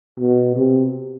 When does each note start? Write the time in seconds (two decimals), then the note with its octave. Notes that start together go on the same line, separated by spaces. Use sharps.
0.20 B2
0.56 C3